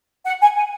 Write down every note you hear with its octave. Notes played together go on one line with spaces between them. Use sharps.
F#5
G#5
G#5